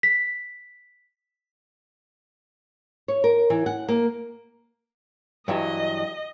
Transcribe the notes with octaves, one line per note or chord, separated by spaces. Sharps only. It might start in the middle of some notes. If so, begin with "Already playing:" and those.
B6
C#5
A#4
E3
F#5
A#3
G2 E3 F#3 D#5